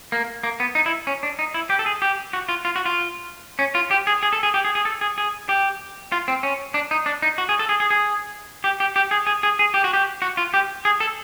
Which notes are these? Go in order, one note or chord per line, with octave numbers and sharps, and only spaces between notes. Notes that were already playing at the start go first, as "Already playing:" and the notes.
A#3
A#3
B3
D#4
E4
C#4
D4
D#4
E4
G4
A4
G#4
G4
F#4
F4
F4
F#4
F4
C#4
F4
G4
G#4
G#4
A4
G#4
G4
G#4
G#4
A4
G#4
G#4
G4
F4
C4
C#4
D4
D#4
D4
D#4
F#4
G#4
A4
G#4
G#4
G#4
G4
G4
G4
G#4
G#4
G#4
G#4
G4
F#4
G4
F#4
F4
G4
G#4
A4